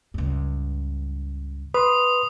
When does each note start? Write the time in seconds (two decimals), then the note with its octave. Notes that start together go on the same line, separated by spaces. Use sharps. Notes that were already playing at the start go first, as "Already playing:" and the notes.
0.14 C#2 G2
1.74 B4 C6 D#6